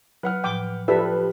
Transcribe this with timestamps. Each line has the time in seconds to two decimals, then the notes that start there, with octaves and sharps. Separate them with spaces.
0.23 F#3 B4 F#5 F6
0.44 A2 F3 G5 D6
0.88 F3 E4 G4 A4 B4 D5 E5